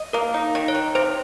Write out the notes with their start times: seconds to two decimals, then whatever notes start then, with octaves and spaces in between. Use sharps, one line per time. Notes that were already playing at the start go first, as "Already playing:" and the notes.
Already playing: D#5
0.13 A#3 A#4
0.34 D#4
0.55 D#3
0.68 C#5
0.75 D#3
0.95 C3 C5